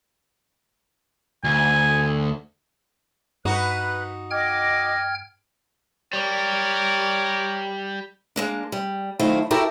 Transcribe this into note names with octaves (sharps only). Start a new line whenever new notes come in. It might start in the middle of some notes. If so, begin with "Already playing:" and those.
D2 G#5
G2 D#4 F#4 B4 F#6
D#5 G5 D6 F6 G#6
G3 A#4 C#5 D6
G#3 A#3 D4
G3
D#3 F#3 A3 E4 F4 C5
E4 F#4 G4 A4 A#4